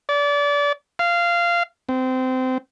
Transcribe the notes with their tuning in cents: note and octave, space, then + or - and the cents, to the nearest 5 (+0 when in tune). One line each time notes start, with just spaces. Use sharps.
D5 -30
F5 -15
C4 -20